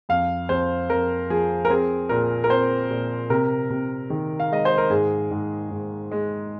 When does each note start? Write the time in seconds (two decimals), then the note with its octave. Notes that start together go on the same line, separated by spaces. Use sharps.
0.09 F2 F5
0.49 F2 C5
0.90 F2 A#4
1.30 F3 G#4
1.65 A#4
1.69 C4 G#4
2.09 A#2 A#4
2.44 A#4
2.50 C4 C5
2.90 A#2
3.30 C3 A#4
3.70 C3
4.10 D#3
4.40 F5
4.51 G#3 D#5
4.65 C5
4.78 A#4
4.90 G#2 G#4
5.31 G#2
5.71 G#2
6.11 G#3